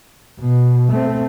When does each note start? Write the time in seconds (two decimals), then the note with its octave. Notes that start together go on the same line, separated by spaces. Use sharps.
0.40 B2
0.92 A3 C4